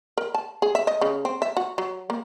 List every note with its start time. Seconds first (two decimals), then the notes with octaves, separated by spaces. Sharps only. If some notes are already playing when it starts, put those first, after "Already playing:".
0.18 A#4
0.34 A5
0.62 G#4
0.75 E5
0.87 D#5
1.01 C#3
1.25 C4
1.42 E5
1.57 F#4
1.78 F#3
2.10 A#3